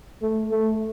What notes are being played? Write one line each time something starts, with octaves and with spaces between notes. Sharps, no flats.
A3
A3